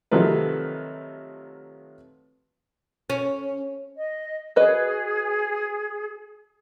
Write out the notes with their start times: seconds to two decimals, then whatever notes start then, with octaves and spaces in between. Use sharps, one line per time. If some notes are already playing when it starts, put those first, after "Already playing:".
0.11 C3 D#3 F3 F#3 A3 B4
3.10 C#4
3.97 D#5
4.56 F#4 G#4 B4 D#5